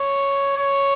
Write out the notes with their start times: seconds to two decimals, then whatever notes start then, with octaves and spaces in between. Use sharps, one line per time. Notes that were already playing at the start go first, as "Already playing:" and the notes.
Already playing: C#5
0.57 C#5